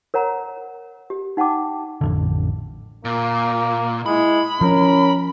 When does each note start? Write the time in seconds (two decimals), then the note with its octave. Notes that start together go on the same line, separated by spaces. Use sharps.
0.14 A#4 C#5 F#5 A#5
1.10 G4
1.37 D#4 F#5 G5 A5 D6
2.01 A1 F2 D3
3.05 A#2 A#3
4.06 G#3 E4 B5
4.61 F3 C#4 A#4